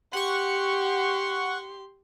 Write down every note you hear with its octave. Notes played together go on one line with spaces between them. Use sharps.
G4 F#5 C6 C#6